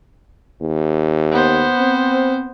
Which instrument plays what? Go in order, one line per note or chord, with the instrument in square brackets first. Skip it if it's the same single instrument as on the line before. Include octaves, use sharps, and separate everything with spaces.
[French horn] D#2
[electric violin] B3 C5
[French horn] C4